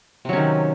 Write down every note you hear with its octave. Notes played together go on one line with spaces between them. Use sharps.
C3 D#3 F#3 C#4